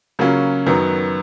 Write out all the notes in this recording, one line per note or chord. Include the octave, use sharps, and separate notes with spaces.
C#3 F#3 A#3 C#4 F4
F#2 D#3 F#3 B3